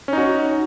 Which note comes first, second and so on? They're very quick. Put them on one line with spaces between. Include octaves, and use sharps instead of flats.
C#4 D#4 F#4